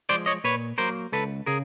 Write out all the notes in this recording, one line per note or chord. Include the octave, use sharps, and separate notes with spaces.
F3 G#3 C5 D5
C#5 D#5
A#2 B4 C#5
F#3 A#3 A#4 C5
C#2 A4 B4
C#3 G#4 A#4